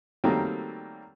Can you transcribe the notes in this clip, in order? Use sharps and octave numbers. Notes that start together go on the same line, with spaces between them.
D#3 F#3 G3 A3 A#3 C4